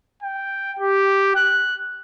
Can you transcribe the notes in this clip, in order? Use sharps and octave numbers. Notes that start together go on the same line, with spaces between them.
G5
G4
F#6